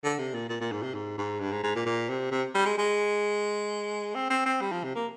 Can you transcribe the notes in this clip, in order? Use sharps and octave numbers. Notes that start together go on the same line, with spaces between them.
D3
C3
A#2
A#2
A#2
G#2
C3
G#2
G#2
G2
G#2
G#2
A#2
A#2
C3
C3
G3
G#3
G#3
C4
C4
C4
G3
F3
C3
A#3